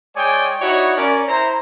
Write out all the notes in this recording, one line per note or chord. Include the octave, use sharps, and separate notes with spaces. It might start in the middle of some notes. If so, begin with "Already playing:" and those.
G#3 C#5 D5 G5 G#5 D#6
D#4 E4 F#4 C#5 D5
C#4 A#4 D5
E4 C5 A#5